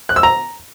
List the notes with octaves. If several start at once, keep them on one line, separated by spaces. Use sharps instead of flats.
F#6
E6
A#5